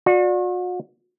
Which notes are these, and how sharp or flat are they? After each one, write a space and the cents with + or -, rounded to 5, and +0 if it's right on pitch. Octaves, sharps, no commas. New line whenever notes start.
F#4 -40 D5 +5